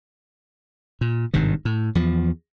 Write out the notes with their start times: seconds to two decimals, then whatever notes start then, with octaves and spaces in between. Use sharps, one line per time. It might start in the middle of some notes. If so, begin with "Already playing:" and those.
1.01 A#2
1.34 G#1 G2 C3 D#3
1.65 A2
1.95 E2 F3